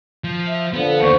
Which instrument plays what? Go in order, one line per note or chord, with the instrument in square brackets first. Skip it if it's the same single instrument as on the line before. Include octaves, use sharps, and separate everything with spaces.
[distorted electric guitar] F3
[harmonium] E5
[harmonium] D3 F3 [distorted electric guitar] B3
[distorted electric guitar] D#2 [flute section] C5 C#6